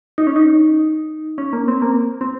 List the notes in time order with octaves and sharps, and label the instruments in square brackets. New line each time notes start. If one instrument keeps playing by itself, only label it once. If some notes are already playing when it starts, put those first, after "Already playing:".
[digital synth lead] D#4
C#4
D#4
C#4
A#3
C4
A#3
C4